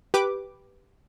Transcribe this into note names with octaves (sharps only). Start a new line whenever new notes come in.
G4 B4 D6